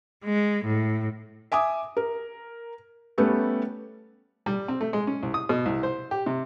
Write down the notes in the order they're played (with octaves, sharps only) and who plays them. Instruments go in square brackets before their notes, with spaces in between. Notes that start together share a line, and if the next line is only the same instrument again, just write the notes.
[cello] G#3
A2
[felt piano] E5 G#5 D6 D#6
A#4
G3 A3 B3 C#4 G4 A4
[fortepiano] G3
C4
A3
G#3
C#4
C2
D#6
B2
C2
C5
G4
C3